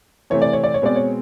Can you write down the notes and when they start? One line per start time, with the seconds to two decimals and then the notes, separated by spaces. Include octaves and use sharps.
0.30 C3 E3 A3 C4 C#5
0.42 D5
0.53 C#5
0.64 D5
0.74 C#5
0.82 B2 G#3 C4 D5
0.96 C#5